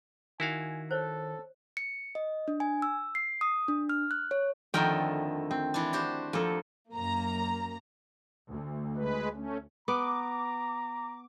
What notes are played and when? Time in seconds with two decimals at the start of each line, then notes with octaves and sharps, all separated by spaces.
0.40 D#3 E4 F#4 F5 G#5
0.91 A4 C5 C#5
1.77 C#7
2.15 D#5
2.48 D4
2.60 G#5
2.82 E6
3.15 C7
3.41 D#6
3.68 D4
3.89 F6
4.11 F#6
4.31 C#5
4.74 F2 D3 D#3 A3 A#4 G5
5.51 C4
5.74 E3 D4
5.93 F#4 G4 C5
6.33 F2 A#3 A4
6.93 F#2 A#3 A#5
8.48 D2
8.96 G#3 B4
9.34 A3 C#4
9.88 B3 A#5 D6